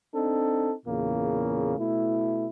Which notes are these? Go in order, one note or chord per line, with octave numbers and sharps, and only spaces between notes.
C4 D4 D#4 A4
E2 A#2 C#3 A#3
B2 A3 E4